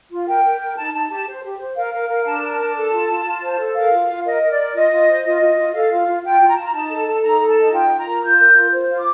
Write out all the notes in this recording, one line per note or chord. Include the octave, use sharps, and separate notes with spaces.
F4
A#4 G5
A#4
A#4
D#4 A5
D#4 A5
G4 A5
C5
G4
C5
A#4 F5
A#4
A#4
D4 A5
A#4
A5
D4
A4
F4
F4
F4
C5
A4
A#4 F5
F4
F4
A#4 D#5
A#4
D5
A#4
F4 D#5
F4
C5
F4 D#5
F4
F4
A4 F5
F4
F4
F4 G5
F4
A#5
F4 A5
A#5
D#4 A5
A4
A4
D#4 A#5
A4
A5
D#4
F4 G5
F4
A#5
A#4
F4 G6
A#4
F4
C5
F4
D6